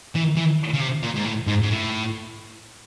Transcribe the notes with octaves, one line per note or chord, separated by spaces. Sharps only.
E3
E3
C#3
C3
A#2
G#2
A2
G#2
G#2
A2